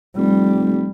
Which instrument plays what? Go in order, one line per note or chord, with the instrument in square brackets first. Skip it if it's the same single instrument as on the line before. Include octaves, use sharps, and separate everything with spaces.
[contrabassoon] F1 [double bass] G3